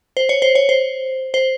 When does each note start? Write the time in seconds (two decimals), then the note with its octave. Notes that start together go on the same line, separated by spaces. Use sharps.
0.17 C5
0.29 C#5
0.42 C5
0.55 C#5
0.69 C5
1.34 C5